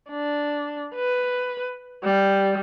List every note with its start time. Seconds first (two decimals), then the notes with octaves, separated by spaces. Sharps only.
0.10 D4
0.95 B4
2.04 G3